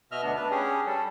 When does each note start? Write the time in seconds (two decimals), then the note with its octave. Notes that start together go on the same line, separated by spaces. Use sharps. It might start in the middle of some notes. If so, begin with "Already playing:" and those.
0.12 B2 D#5 E5 F6
0.23 D2 B3 D4
0.36 D4 B4
0.51 C#4 G4 G#4
0.86 G3 A4